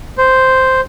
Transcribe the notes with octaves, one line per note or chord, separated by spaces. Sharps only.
C5